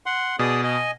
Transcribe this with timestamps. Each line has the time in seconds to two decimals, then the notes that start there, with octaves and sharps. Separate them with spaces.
0.06 F#5 C6
0.39 B2 G#4 D5 D#6
0.64 D#5 G#5